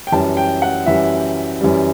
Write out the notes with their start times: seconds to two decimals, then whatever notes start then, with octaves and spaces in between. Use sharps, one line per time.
0.07 G5
0.12 F#2 E3 G3 A5
0.37 G5
0.62 F#5
0.86 F#2 E3 G3 E5
1.61 F#2 E3 G3